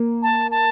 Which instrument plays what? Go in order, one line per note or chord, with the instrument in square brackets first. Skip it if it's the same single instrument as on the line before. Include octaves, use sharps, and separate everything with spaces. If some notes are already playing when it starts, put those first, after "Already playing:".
Already playing: [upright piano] A#3
[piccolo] A5
A5